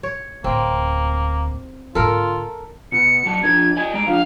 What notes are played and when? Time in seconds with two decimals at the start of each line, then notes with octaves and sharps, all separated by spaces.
0.03 C#5
0.44 D1 D2 A#3 C4
1.95 G#2 D3 F4 A4 A#4
2.92 B2 C#7
3.25 F#2 F#3 A5
3.43 F3 D4 A#4 G#6
3.77 D5 D#5 G#5
3.94 G#3 A#5 D7
4.07 F3 D4 F5